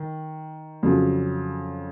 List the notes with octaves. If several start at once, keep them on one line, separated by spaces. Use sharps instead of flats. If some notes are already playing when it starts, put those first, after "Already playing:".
Already playing: D#3
F2 C#3 F#3